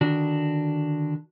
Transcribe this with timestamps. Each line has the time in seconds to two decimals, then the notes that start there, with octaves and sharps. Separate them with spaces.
0.01 D3 D#3 D4 F#4